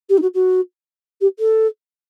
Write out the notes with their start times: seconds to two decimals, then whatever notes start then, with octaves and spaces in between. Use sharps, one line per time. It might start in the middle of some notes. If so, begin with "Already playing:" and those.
0.09 G4
0.17 D#4
0.21 F#4
0.34 F#4
1.21 G4
1.39 A4